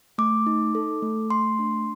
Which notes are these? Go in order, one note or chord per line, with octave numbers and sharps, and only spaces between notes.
A3 D6
D#4
A4
A3
A3 C6
D4